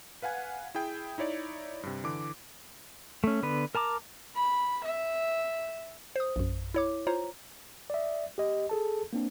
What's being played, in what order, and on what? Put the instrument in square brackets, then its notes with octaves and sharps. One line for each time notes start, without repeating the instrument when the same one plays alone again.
[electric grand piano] B4 F5 F#5 G#5 G#6
E4 G#4 G5
D#4 E4 C#5 D5
G2 C3
D3 E3 D6
[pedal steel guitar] A3 C#4
D3 B3 B4
A#4 A5 A#5 D6
[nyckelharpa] B5
E5
[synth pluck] C5 D#6
A#1 F#2
E4 C#5 D6
F4 C5 C#5 A#5
[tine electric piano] D5 E5
G4 D#5
G#4 A4 A5
A#3 C4 D4